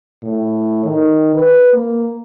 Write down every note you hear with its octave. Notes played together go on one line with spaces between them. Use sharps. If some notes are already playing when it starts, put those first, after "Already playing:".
A2
D#3
B4
A#3